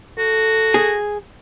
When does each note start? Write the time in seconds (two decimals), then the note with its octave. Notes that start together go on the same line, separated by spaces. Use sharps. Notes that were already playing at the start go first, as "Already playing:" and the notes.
0.18 F#4 A4
0.74 G#4